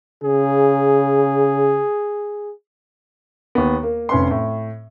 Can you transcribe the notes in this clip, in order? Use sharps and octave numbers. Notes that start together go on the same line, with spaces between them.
C#3 G#4
D#2 B3
A#3
F1 C#4 B4 C6
A2